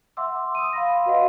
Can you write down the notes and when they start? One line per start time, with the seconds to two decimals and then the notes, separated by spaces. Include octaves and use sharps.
0.17 E5 F#5 C6 D6 E6
0.55 D#6 E6 D#7
0.73 F5 B5 C6 A#6
1.06 F#4 B4 D#5 F5 F#5